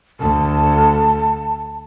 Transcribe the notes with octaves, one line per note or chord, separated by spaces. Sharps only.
D2 A5